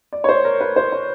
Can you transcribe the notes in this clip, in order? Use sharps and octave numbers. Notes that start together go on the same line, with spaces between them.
D5
C#5
C5
A#4
B4
C5
C#5